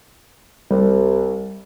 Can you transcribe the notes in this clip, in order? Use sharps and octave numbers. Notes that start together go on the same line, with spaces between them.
C2 G3